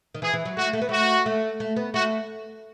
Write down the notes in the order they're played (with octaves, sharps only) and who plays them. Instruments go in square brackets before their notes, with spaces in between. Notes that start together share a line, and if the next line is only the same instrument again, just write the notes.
[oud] D#3
[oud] E3 [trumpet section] G#4
[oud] E3
F#3
[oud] A3 [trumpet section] F#4
[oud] A3
B3
[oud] A3 [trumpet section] F#4
[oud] A3
A3
B3
[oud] A3 [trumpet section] F#4